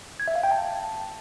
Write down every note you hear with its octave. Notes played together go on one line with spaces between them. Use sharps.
G#6
E5
F5
G5
A5